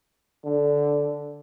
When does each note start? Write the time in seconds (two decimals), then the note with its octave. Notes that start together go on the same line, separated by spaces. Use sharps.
0.45 D3